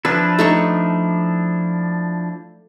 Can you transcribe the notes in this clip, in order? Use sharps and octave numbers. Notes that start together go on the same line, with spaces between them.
F3 D4 E4 B4
A3 D#4 C#6